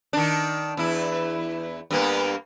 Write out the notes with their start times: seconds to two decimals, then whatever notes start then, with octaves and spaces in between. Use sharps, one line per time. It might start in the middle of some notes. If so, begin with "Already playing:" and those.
0.13 D#3 D4
0.77 E2 E4
1.91 G2 A#3 B3